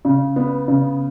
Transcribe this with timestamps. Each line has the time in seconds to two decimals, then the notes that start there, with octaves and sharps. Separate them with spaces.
0.05 C#3
0.36 B3
0.68 C#3